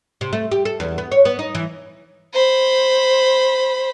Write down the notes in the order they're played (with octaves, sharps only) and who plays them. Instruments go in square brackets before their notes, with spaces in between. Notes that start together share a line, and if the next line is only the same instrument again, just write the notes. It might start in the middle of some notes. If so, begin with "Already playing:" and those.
[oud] C3
A3
G4
A4
E2
B3
C#5
B3
D#4
E3
[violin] C5 B5